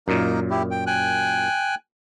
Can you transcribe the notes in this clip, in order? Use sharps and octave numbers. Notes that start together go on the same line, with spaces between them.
F#2 A#2 A#3 D#4 A#4
E4 G4
G5
G5 G#5 F#6